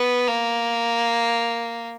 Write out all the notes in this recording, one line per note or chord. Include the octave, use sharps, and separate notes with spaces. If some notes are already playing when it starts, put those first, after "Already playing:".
Already playing: B3
A#3